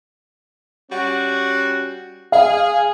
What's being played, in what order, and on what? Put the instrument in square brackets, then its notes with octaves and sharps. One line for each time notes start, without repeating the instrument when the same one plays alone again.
[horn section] G3 C#4 F#4
[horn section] G#4 [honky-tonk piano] F5